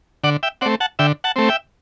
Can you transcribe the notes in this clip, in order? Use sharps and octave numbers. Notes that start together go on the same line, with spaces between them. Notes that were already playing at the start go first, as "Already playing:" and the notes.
D3 D5 F#5
E5 G5
A3 C4 D5 F#5
F#5 A5
D3 E5 G5
F#5 A5
A3 C4
E5 G5